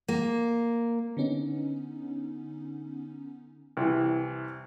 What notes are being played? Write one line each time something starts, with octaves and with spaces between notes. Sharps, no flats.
A#3
D3 B3 C#4 D#4
C2 E3